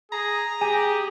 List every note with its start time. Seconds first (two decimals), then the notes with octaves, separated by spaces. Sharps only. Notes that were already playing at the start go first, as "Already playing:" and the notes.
0.12 G#4 A#5
0.61 G4 G#4 G#5